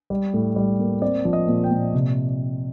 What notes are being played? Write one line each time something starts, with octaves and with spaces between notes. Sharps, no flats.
G3
A2
G3
A#3
C4 D5
F3
D#5
A#2
G5
A#2
C3